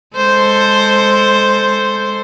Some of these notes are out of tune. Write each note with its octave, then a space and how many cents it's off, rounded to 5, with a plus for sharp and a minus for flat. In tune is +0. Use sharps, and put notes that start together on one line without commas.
G#3 -10 A4 +0 C5 +0